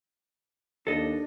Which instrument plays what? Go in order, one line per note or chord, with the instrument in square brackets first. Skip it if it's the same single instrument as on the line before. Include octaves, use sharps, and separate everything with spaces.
[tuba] D#2 [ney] D4 [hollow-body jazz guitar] A4 D#5